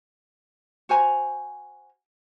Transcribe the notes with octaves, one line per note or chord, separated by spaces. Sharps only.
F#4 C5 G#5 A#5